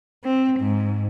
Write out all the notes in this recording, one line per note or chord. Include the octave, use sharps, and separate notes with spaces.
C4
G#2